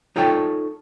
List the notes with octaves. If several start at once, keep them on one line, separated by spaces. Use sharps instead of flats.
D#4 F4 A4 C#5 G5 A5